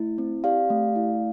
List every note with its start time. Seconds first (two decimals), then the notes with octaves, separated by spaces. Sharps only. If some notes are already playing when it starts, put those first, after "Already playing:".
Already playing: A3 E4
0.18 C4
0.44 G4 D5 F5
0.70 A3
0.96 E4